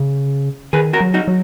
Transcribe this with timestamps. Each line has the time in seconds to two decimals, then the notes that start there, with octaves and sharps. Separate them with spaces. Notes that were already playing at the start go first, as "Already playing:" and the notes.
Already playing: C#3
0.73 D#3 G#4 B4
0.93 F#4 A#4
1.01 F#3
1.14 D#4 F#4
1.28 F#3